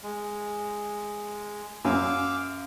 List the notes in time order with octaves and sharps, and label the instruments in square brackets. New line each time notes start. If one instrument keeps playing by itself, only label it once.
[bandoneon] G#3
[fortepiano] F#2 G#5 [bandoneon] F5 D6 E6